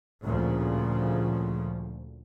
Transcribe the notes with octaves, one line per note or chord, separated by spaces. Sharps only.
D2 A#2 C#3 F3